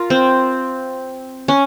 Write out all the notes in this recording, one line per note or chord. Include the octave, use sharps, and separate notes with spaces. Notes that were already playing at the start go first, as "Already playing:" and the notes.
Already playing: F4 A#4
C4
C#4